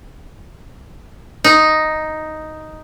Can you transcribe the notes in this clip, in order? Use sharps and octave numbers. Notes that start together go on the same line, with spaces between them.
D#4